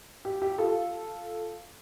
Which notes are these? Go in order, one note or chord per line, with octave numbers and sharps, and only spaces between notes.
G4
G4
F4 A4